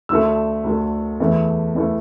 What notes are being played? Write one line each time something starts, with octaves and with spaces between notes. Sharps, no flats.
D2 D3 A3 E6
D2 D3 A3
E2 E3 A3
E2 E3 A3